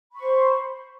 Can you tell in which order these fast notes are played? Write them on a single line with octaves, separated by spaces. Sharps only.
B5 C#6 C5